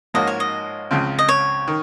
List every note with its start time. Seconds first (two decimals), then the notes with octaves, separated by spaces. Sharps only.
0.14 G#2 F3 A#3 C#4 F#4 D#5
0.27 C#5
0.40 D#5
0.91 C#2 C#3 F3 C4 F4
1.19 D#5
1.29 C#5
1.68 D#3